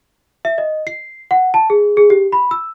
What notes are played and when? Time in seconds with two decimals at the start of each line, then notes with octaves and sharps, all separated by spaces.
0.45 E5
0.58 D#5
0.87 C7
1.31 F#5
1.54 A5
1.70 G#4
1.97 G#4
2.10 G4
2.32 B5
2.51 E6